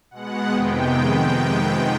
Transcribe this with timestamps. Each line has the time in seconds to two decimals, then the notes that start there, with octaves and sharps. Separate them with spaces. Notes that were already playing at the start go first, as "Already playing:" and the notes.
0.11 B2 G#3 B3 F#5
0.51 F2 C3 D#3 G#3 B3 G5